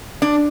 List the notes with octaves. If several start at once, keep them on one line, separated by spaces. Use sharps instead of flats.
D4